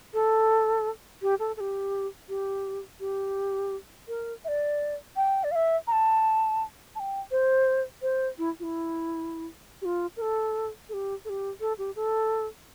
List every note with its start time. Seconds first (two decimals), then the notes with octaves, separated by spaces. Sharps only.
0.14 A4
1.22 G4
1.39 A4
1.57 A4
1.60 G4
2.29 G4
3.00 G4
4.08 A#4
4.44 E5
4.48 D5
5.16 G5
5.44 D5
5.51 F5
5.55 E5
5.87 A#5
5.92 A5
6.95 A5
7.00 G5
7.31 C5
8.02 C5
8.38 E4
8.60 F4
8.63 E4
9.82 G4
9.85 F4
10.17 A#4
10.22 A4
10.89 A4
10.93 G4
11.25 A4
11.29 G4
11.60 A4
11.78 G4
11.96 A4